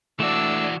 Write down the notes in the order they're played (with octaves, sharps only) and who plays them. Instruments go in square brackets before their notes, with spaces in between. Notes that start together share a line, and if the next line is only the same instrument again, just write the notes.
[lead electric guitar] E3 F#4 [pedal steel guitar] A3 D4 [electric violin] D5 E6